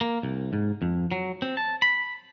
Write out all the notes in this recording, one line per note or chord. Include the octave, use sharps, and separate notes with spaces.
A#3
C2
G#2
F2
F#3
C4
A5
B5